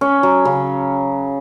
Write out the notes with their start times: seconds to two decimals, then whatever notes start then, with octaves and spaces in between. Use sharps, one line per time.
0.01 C#4
0.23 F#3
0.45 C#3